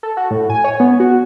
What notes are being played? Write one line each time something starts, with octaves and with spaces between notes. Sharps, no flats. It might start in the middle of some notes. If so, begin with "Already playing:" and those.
A4
F#4
A2
G#5
C#5
B3
F#4